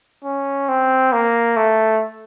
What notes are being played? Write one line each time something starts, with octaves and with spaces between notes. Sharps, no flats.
C#4
C4
A#3
A3